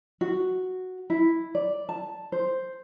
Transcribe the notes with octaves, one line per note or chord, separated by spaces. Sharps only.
F#4
E4
D5
A5
C5